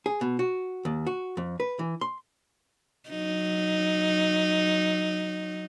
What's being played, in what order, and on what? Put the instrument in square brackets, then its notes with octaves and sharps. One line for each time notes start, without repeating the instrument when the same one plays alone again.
[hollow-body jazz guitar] G#4
B2
F#4
D#2
F#4
F2
B4
E3
C6
[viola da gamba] F#3 D#4